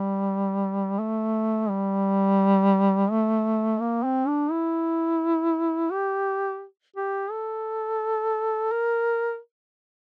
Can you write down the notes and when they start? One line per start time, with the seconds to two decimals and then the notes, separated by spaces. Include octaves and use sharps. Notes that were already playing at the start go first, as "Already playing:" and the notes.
Already playing: G3
0.99 A3
1.70 G3
3.11 A3
3.80 A#3
4.04 C4
4.27 D4
4.51 E4
5.91 G4
6.96 G4
7.31 A4
8.72 A#4